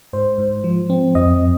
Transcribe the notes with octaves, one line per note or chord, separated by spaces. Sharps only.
G#2 C5
G#2
F3
C4
F2 D#5